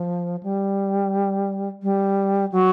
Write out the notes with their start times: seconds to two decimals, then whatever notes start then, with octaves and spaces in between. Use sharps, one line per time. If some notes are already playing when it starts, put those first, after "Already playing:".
Already playing: F3
0.43 G3
1.83 G3
2.52 F#3